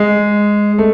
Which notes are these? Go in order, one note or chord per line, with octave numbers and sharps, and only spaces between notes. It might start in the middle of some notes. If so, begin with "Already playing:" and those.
Already playing: G#3
A3